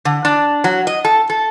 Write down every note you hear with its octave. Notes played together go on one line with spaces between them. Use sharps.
D3
D4
F#3
D#5
A4
A4